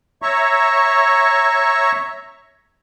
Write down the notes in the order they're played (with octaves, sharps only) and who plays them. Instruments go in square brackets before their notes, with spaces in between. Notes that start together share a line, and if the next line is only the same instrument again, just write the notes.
[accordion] C#5 E5 A#5 C#6